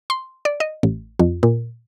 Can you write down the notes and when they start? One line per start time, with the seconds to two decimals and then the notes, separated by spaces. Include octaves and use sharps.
0.10 C6
0.45 D5
0.60 D#5
0.83 A1
1.19 F2
1.43 A#2